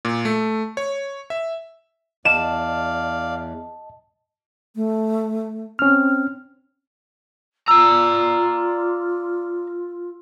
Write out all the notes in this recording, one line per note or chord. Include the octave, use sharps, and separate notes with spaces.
A#2
A3
C#5
E5
E2 D5 D#5 F5 A5 E7
A3
C4 C#4 F6
F4 D5 A#5 E6